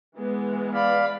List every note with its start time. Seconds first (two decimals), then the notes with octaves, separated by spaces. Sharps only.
0.17 E3 G#3 B3
0.74 D5 F5 B5